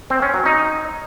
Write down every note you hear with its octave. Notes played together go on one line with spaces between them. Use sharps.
C4
C#4
F#3
D#4